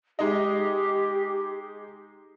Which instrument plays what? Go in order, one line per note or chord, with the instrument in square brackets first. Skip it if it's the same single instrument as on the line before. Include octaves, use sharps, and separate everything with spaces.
[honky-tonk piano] G#3 D#4 D#5 [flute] G4